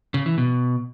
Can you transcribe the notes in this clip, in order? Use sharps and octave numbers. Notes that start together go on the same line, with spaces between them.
C#3
E3
B2